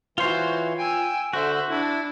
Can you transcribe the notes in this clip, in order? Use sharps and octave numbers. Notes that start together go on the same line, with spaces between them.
E3 F4 F#4 C5 C#5 C6
G5 G#5 E6
D3 F#4 C5 E5
D4 E4